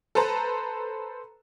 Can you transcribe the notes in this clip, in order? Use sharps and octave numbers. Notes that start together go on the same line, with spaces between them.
A4 B4 C5 A5 A#5